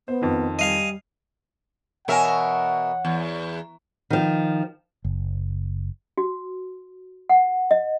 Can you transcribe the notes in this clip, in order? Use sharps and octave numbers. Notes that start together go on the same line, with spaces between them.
B3 C5
F2 D#3
G3 D#5 F5 G#5
B2 E3 A#4 C#5 E5 F#5 G#5
E2
D#3 F3
F#1
F#4
F#5
D#5